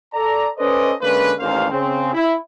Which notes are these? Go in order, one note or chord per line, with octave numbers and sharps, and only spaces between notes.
A4 D5 A#5
C#4 A4 B4 C5 D5 D#5
D3 G#3 A#3 C#4 D4 B4
A1 D#2 A#3 C#4 C5 F5
C#3 C4
E4